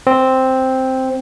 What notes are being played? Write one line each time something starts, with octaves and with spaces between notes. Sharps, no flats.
C4